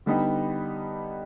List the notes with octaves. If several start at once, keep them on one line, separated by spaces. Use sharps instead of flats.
D3 G3 B3 D#4 G4